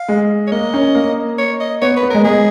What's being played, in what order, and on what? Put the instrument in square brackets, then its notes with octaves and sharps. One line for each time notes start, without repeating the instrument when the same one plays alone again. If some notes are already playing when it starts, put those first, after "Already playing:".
Already playing: [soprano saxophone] F5
[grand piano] G#3
[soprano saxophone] C#5
[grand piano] A#3 [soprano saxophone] D#5
[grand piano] C#4
A#3
[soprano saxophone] C#5
D#5
[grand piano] B3 [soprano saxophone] C#5
[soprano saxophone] B4
[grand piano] B3
[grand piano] G#3 [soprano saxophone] A#4
[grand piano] G#3 [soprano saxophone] G#4